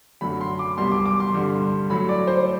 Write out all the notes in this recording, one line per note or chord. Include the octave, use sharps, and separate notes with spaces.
F#2 D3 F#3 A3 B5
C6
D6
C2 B2 G3 C6
D6
D6
C6
G2 D3 G3
A2 F#3 A3 B5
D5
C5